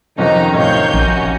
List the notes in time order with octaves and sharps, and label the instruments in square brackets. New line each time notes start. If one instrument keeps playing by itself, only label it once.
[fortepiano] F2 C3 C#4 [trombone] D#3 [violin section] D#4 A#5
[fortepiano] A1 C3 [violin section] C#5 F5 G6
[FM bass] A#1 [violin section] C#4 F#4